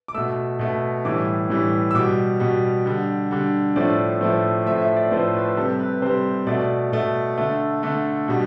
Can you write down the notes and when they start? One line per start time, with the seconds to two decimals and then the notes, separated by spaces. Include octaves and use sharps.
0.08 D6
0.14 B2 A3 E6
0.59 B2 A3
1.05 A2 E3 G3 D6
1.50 A2 E3 G3
1.91 E6
1.95 B2 G3 D6
2.40 B2 G3
2.86 D3 G3
3.31 D3 G3
3.76 A2 F3 A3 D5
4.21 A2 F3 A3
4.66 A2 F3 A3 E5
4.82 E5
4.96 D5
5.11 A2 F3 A3 C5
5.34 B4
5.57 C3 G3 A4
5.80 B4
6.02 C3 G3 C5
6.47 B2 A3 D5
6.92 B2 A3
7.38 D3 A3
7.83 D3 A3
8.28 B2 G3